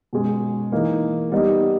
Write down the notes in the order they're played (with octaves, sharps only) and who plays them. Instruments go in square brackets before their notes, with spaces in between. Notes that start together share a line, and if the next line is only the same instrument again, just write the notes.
[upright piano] B2 G#3 C#4
E3 A#3 D#4
G3 B3 D#4